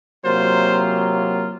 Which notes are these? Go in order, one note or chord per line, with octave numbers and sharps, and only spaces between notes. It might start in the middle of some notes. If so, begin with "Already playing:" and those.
C3 F#3 A#3 F4 C5